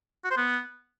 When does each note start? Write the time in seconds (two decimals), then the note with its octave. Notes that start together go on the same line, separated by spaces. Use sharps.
0.24 F#4
0.31 C5
0.37 B3